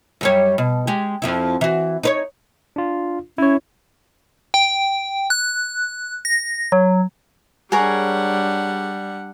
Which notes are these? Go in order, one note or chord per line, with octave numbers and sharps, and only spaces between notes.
F#2 G3 C#5
B2
G#3 G4
F2 F3 E4
E3 F#4
D#4 B4 C#5
D4 F4
C#4 E4 C#5
G5
F#6
A#6
F#3
G3 D4 G#4 A#4 C#5 F#5